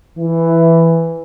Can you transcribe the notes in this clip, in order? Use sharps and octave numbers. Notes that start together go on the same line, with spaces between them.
E3